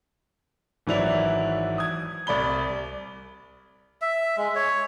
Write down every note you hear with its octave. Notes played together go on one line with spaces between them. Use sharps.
G#1 E3 F#3 E4 D5 F7
D#6 G#6
C2 D5 B5 G7
E5
G#3
C#5